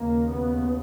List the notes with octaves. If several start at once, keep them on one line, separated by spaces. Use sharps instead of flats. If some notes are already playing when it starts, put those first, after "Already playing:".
Already playing: D#2 C#3 A#3
B3